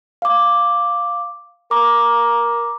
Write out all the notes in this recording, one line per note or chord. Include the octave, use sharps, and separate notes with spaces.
F5 D6
A#4 D6